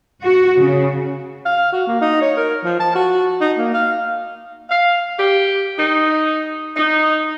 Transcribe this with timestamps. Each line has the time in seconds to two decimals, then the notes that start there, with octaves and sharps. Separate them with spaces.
0.23 F#4
0.60 C#3
1.45 F5
1.72 F#4
1.87 A#3
2.01 D#4
2.21 C#5
2.37 A#4
2.64 F3
2.80 A5
2.95 F#4
3.41 D#4
3.58 A#3
3.74 F5
4.69 F5
5.19 G4
5.78 D#4
6.76 D#4